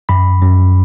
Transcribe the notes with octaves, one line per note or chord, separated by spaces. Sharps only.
F#2 B5
F#2